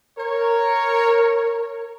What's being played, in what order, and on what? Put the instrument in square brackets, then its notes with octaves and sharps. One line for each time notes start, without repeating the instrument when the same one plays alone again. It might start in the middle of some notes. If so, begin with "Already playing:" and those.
[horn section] A#4 C#5